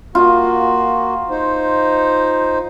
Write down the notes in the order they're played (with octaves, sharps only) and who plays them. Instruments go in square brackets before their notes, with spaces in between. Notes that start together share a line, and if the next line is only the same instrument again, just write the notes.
[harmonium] A#3 F#4 [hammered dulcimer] F4
[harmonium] D#4 C5